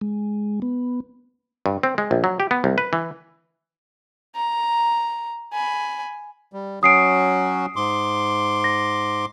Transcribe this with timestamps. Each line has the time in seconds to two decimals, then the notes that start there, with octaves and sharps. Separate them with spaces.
0.01 G#3
0.62 B3
1.66 G2
1.83 C4
1.98 G#3
2.11 A#1
2.24 F#3
2.40 G4
2.51 B3
2.64 C2
2.78 B4
2.93 E3
4.35 A#5
5.53 G#5 B5
6.53 G3
6.83 F#3 C#4 F#4 D#6 C7 D7
7.76 G#2 C6 D6
8.64 A#6